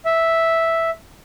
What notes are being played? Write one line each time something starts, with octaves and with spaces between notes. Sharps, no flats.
E5